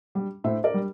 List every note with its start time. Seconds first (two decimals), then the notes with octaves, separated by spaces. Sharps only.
0.15 G3
0.44 A2 C5 E5
0.64 A#4 D5
0.74 G3